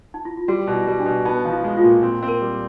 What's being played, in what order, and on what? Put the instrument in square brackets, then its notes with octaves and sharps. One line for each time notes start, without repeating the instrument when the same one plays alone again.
[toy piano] D#4
E4
F4
[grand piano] G3 [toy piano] F#4
[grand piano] B2
[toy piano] E4
[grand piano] G3
[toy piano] D4
[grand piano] B2
[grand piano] B3 [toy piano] D#4
[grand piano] F3
[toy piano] E4
[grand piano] G#3
[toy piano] F4
[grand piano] A#2
C4
C4
[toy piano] A#4
[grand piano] G3